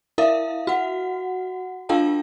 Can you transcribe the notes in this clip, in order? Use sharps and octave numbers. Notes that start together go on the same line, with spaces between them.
E4 A#4 E5 F5
F#4 F#5
D4 F4 A4 F5 G5 A5